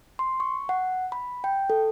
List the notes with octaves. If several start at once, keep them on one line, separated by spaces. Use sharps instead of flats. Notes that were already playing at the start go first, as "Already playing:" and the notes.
C6
C#6
F#5
B5
G5
A4